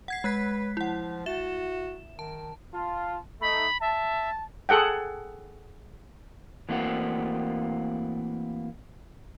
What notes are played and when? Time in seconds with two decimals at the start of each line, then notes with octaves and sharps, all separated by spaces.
0.08 F#5 G#6 C7
0.24 G#3 B4 F#6 B6
0.77 F3 E4 F#5
1.26 F#4 E5 E7
2.19 D#3 A5
2.74 F4 A5
3.41 A3 D#4 B5
3.81 E5 A5
4.69 G#4 A4 F#5 G5
6.69 E3 A3 A#3 C4 F#4